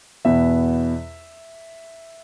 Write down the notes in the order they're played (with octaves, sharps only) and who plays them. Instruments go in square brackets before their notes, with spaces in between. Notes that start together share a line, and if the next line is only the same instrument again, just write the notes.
[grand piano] E2 B2 B3 E4 E5